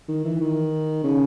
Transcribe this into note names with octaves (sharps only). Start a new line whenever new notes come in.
D#3
E3
D#3
C#3